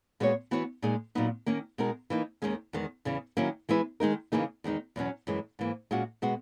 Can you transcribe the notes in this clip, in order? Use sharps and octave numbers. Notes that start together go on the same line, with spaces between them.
A#2 G#3 B3 F#4 C#5
E3 B3 F#4 C#5
A#2 G#3 D#4 G#4
A#2 F#3 B3 D#4
D#3 A#3 C#4
B2 G#3 D#4 A#4
E3 A#3 D#4
D#2 D#3 G#3 C#4
E2 D#3 G#3
E2 C#3 E3
D#3 F#3 A#3 C#4 E4
E3 G#3 B3 E4 B4
D#3 G#3 D#4 A#4
C#3 E3 A#3 D#4 G#4
E2 D#3 G#3 D#4
E2 B2 F#3 C#4
F#2 E3 G#3
G#2 E3 A#3
A#2 G#3 C#4 F#4
B2 G#3 B3 F#4